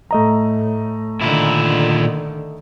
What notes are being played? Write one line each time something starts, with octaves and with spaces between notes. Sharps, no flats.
A2 A3 D#5 A#5
A#2 D3 D#3 E4